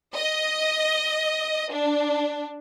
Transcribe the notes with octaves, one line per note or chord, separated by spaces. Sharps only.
D#5
D4